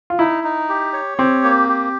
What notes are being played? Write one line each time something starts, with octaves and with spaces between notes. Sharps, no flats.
F4
D#4 E4
D#4
G4
C#5
C4 G4
A#3
G4